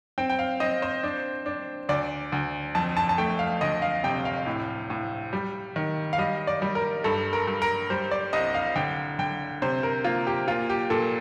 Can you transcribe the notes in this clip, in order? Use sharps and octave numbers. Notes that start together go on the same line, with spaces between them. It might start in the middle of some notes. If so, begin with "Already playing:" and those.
C4 G5
G5
F5
C4 D#5
C5
D4
D4
D2 D5
D2
F2 A5
A5
A5
A3 G5
F5
D2 D#5
F5
C3 G5
F5
A2
A2
G3
D#3
F5
G3 D#5
D5
G3
A#4
G2 A4
A#4
G2
A#4
G3 C5
D5
C2 D#5
F5
D3 G5
D3 G5
C3 C5
A#4
A#3 F4
G4
A#2 F4
G4
A#2 A4